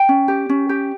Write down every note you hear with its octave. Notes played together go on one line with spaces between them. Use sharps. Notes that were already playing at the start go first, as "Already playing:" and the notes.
Already playing: G5
C#4
G4
C#4
G4